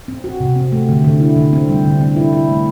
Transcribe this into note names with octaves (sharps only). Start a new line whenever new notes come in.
C4
F#4
C3
C4
A3
D3
D3
E4
D3
C4
G3
D3
C4
E4
E4
A3